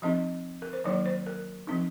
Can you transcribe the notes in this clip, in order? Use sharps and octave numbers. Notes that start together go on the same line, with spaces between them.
F3 C4 D#4 D#5
A#4
C5
D#3 F#3 A#3 D#4 C#5
C5
A#4
F3 C4 D#4